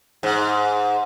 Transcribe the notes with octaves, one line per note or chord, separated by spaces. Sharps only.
G#2